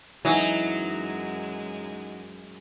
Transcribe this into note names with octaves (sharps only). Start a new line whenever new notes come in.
F#2 E3 F#3 G#3 D#4